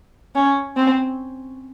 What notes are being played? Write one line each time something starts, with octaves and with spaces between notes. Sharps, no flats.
C#4
C4